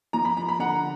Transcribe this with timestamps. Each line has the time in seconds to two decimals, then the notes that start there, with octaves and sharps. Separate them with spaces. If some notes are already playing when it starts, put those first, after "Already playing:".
0.13 F3 A#5
0.25 B5
0.37 A#5
0.48 B5
0.59 D3 F#5 A#5